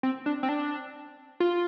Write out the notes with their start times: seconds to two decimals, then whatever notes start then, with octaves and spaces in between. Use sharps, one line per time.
0.03 C4
0.26 D4
0.43 C4
0.49 D4
1.40 F4